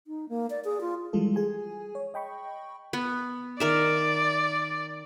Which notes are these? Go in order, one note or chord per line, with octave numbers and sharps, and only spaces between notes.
D#4
A#3
D5
G#4
F4
E3 F3 G3 G#3 F4 A4
G#4 G#5
C#5
D#5 G5 B5 C#6
B3
D#3 A#4 D5 E5